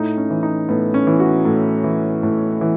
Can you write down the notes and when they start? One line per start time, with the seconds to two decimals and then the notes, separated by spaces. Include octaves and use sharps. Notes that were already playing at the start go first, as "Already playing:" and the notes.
Already playing: A2 D#4
0.17 C#4
0.30 E3
0.43 D#4
0.69 A2 B3
0.94 C#4
1.07 E3
1.20 F#4
1.45 A2
1.84 E3
2.23 A2
2.61 E3